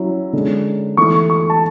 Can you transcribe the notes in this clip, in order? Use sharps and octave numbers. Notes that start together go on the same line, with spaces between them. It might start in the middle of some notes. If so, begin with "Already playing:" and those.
Already playing: F#3 C#4 E4
D3 G#3 C#4
E3 A3 E4 C#6
C#6
A5